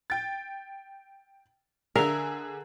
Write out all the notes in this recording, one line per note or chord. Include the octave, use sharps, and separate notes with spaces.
G5 A6
D3 G#4 A#4 E5 F5